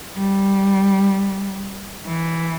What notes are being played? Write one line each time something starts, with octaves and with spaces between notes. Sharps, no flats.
G3
E3